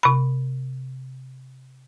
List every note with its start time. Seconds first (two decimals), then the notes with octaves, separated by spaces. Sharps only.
0.03 C3 B5